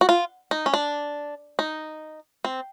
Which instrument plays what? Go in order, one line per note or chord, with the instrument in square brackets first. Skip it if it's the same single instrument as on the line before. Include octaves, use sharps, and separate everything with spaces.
[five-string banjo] F#4
F4
D#4
C#4
D4
D#4
C4